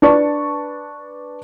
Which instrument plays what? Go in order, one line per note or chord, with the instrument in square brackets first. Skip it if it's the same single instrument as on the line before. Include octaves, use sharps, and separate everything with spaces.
[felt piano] D4 B4 D5 A5 C#6